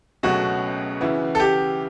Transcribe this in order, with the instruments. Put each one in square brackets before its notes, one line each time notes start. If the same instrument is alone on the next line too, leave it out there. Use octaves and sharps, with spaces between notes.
[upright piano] C#2 B2 F#3 A3 C#4 [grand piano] F#4
[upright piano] C#3 E3 B3 E4
[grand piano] A4
G4